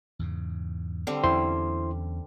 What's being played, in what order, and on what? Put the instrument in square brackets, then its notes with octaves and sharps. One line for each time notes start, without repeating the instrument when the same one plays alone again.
[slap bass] E2 G#2 C#3
[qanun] D3 G3 C4
[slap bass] E2 A#3 C#4 [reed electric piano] E4 C5 C6